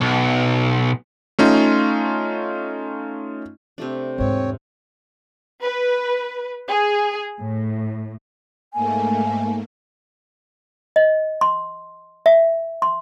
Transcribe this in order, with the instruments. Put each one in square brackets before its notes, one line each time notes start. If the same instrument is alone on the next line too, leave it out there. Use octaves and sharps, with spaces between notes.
[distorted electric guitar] B1
[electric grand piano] A3 C#4 D#4 F4
[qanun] C3 A3 D4
[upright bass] E2 G#2 [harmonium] C4 C#5
[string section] B4
G#4
A2
[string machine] G#2 A3 A#3 [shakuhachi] G#5
[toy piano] D#5
C6
E5
C6